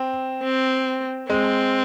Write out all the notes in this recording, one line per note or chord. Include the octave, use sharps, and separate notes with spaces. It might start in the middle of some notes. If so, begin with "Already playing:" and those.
Already playing: C4
C4
G#3 C4